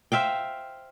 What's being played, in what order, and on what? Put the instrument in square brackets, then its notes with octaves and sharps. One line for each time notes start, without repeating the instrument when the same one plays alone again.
[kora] C5 E5 F5 G5